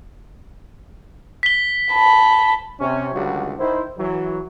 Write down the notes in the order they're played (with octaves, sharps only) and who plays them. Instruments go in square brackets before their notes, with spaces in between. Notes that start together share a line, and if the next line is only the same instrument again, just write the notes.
[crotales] B6 G7
[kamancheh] A5 B5
[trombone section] C3 C#4
C#2 D3 D#3 F#3 G3 F#4
D#3 E4 C5
E3 F#3